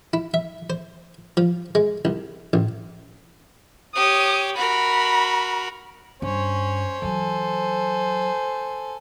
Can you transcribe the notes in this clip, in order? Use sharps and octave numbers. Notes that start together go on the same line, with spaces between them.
E4
E5
C5
F3
G#3
C2
A1
G4 C#5 D#6
F#4 A#4 B5
G2 C#4 C5 C#5
E3 F#3 A4 G#5